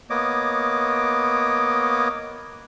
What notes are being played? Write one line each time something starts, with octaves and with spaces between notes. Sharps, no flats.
A#3 B3 C#5 D#5 D6